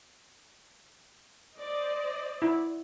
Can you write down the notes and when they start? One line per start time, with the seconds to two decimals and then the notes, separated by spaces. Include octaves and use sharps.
1.57 C5 D5 D#5
2.42 E4